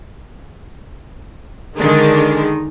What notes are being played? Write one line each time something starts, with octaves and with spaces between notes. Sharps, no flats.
D3 D#3 G#3 D4